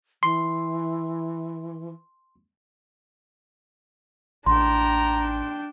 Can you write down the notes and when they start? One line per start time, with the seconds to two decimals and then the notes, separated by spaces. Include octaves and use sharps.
0.23 E3 C6
4.46 A1 D4 G5 A#5 C6